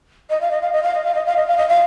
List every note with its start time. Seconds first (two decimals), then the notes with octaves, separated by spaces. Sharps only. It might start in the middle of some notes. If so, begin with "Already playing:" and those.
0.30 D#5
0.41 F5
0.51 D#5
0.61 F5
0.72 D#5
0.83 F5
0.94 D#5
1.04 F5
1.15 D#5
1.26 F5
1.37 D#5
1.47 F5
1.57 D#5
1.69 F5